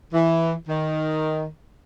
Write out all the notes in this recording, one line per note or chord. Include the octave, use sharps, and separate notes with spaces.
E3
D#3